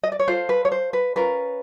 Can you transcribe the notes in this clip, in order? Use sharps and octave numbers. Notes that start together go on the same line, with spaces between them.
D#5
D5
C#5
F4 A4 C5
B4
C#5
C5
B4
C#4 F4 A#4 B4